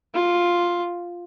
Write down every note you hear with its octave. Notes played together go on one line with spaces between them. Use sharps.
F4